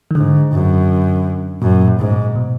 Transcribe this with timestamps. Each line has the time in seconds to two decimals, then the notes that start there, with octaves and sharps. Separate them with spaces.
0.11 D#3
0.15 G#2 D3
0.52 F#2
1.62 F#2 A#2
1.87 A#2
1.99 G#2
2.11 A#2
2.36 B2